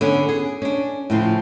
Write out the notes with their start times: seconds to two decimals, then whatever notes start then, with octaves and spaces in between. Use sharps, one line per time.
0.01 D3 B3 C#4
0.29 G#4
0.62 C#4 D4
1.10 A2 C#3 F3